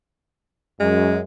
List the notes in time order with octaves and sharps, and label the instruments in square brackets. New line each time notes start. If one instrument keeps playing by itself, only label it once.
[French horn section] F#2 [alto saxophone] G#3